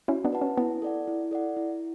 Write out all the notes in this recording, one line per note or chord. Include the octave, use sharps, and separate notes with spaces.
C#4 E4 F#4
B3 D4
B4 F#5 A5
C#4
B3 E4
A4 D5 F#5
E4
A4 D5 F#5
E4